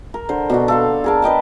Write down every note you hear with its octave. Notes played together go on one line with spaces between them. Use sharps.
A#4
D3 C5
B2 D4 F#4
A4 F5 C6
G#4 A#4 A5
B4 D#5 G5 A5